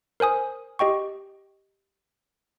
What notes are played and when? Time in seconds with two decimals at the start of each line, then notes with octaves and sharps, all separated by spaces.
0.20 A#4 C5 G#5 D#6
0.79 G4 D#5 G5 C#6